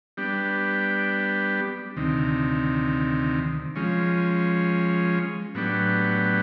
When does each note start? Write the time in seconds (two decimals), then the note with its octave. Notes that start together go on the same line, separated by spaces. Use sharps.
0.17 G3 B3 D4 G4
1.97 D2 C3 D#3
3.75 F3 G#3 C#4
5.55 A2 F#3 B3 D4 G4